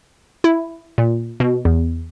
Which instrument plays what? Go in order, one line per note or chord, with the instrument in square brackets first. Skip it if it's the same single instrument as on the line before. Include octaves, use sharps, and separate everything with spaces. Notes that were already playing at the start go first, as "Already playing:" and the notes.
[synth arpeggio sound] E4
A#2
B2
E2